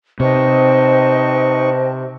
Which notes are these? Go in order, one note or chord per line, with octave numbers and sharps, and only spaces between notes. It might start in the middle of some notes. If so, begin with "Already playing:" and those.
C3 D#4 B4 C5 D#5 G5 A5 C#6